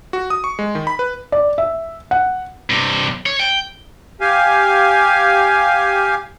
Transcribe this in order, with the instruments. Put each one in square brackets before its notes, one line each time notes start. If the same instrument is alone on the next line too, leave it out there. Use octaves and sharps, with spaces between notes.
[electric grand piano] F#4
D#6
C#6
G#3
D#3
B5
B4
[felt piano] D5
E5
F#5
[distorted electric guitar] G2 C3
C#5
G5
[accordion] G4 F5 G#5